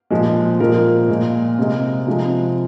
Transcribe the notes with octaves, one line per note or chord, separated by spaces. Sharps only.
A#2 F3 G#3
A#2 F3 G#3 A#4
A#2 G#3
C3 G#3
C3 F3 G#3